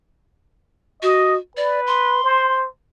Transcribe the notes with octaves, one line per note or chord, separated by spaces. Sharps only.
F#4 D#5
B4 D5
C6
C5